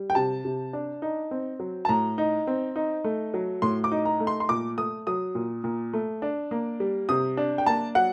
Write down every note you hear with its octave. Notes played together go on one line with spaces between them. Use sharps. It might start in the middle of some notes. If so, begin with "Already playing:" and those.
Already playing: G3
G5
C3 A5
C3
D4
D#4
C4
F#3
A5
A2 A#5
D#4
C4
D#4
A3
F#3
A2 C6
D6
D#4
A#5
A3
C6
C6
A#2 D6
A3 D#6
F#3 D#6
A#2
A#2
A3
D4
A#3
G3
C3 D#6
D4
G5
A#3 A5
F#3 F#5